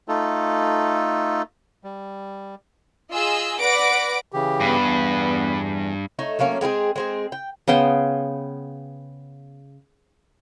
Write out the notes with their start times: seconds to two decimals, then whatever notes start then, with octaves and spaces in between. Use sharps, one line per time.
0.08 A3 D#4 F4 A4
1.84 G3
3.11 F4 G#4 D#5 E6
3.60 B4 D5 F#5 D6 A#6 D7
4.32 C#3 E3 G4
4.60 G2 B3
4.83 E2 E3
6.19 A3 D#4 C#5
6.39 F#3 A3 A#3 C#4
6.61 G#3 C4 E4 G#4
6.96 G#3 C4 G#4
7.32 G5
7.68 C#3 B3 G5 C6